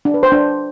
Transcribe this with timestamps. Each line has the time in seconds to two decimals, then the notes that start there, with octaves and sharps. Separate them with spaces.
0.05 D4
0.14 B4
0.23 C5
0.32 D4